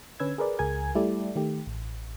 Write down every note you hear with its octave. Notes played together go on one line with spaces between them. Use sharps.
D3 C#4 B4 E6 G#6
G#4 A#4 B4 D5
C#2 G#4 A#4 G#5 G#6
G3 A3 E4 G4 A4 D5
D#3 A3 G4
A1